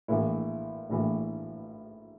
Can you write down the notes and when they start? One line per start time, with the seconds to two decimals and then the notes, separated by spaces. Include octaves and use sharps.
0.08 A#1 A2 E3 E4
0.90 A#1 A2 E3